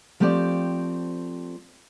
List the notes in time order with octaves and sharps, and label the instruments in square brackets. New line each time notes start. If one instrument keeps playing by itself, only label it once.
[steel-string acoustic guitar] F3 A3 C4 G4 D5